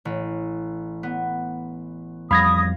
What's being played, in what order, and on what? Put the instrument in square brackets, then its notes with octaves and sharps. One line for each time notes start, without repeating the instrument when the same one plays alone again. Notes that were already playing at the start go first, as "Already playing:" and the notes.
[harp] A1
B3
[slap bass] F2 G3 [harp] F5 [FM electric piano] B5 G#6 A#6 [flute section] D#6